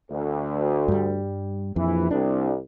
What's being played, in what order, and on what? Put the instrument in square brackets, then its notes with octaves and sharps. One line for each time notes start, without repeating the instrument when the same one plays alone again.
[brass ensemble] D2
[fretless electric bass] G2 G3
[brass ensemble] A#1 E3 [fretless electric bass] F2
[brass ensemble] C2 [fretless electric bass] D4